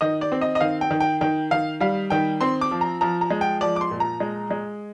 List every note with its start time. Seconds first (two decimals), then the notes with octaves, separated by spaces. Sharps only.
0.01 D#3 D#5
0.21 D5
0.32 C4
0.41 D#5
0.55 D#5
0.61 D#3 F5
0.81 G5
0.91 D#3
1.00 G5
1.21 D#3 G5
1.51 D#3 F5
1.80 G3 F5
2.10 D#3 G5
2.41 C4 C6
2.61 D6
2.71 F3
2.81 A#5
3.01 F3 A#5
3.21 A#5
3.31 G#3
3.41 G5
3.61 F3 D5
3.76 D6
3.81 C6
3.91 A#2
4.00 A#5
4.20 G#3
4.51 G#3